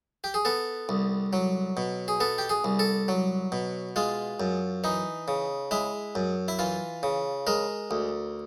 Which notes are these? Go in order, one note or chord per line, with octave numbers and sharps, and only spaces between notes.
G4
G#4
B3 A4
C2
F#3
B2
G#4
B3 A4
G4
G#4
C2
A4
F#3
B2
G#3 F4
F#2
E3 D#4
C#3
G#3 E4
F#2
E4
E3 F4
C#3
G#3 A#4
D2